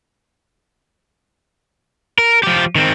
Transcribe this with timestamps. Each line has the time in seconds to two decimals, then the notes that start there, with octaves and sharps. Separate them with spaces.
2.18 A#4
2.43 F3 G4
2.75 D#3 C4